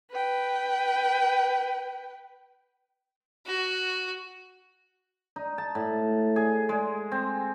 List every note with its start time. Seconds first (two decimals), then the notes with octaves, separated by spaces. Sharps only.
0.11 B4 G5
3.46 F#4
5.36 D#4
5.58 A5
5.75 A2
6.36 G#4
6.69 G#3
7.12 C4